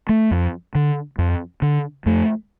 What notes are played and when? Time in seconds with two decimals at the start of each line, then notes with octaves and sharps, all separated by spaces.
0.09 A3
0.31 F2
0.75 D3
1.18 F2
1.62 D3
2.06 F2 A3